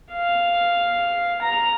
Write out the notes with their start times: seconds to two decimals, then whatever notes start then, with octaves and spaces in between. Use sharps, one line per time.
0.12 F5
1.42 A#5